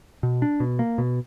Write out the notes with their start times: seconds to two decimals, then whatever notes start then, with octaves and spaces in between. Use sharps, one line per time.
0.23 B2
0.42 D4
0.60 B2
0.79 A#3
0.98 B2